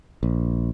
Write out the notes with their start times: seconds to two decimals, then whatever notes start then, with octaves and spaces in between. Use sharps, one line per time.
0.23 A#1